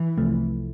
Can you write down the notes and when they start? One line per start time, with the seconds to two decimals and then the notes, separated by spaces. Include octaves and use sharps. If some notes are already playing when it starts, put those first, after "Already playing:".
Already playing: E3
0.17 C2 C3 F3 A3